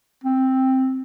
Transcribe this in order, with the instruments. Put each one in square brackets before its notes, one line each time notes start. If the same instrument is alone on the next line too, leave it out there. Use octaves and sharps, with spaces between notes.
[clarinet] C4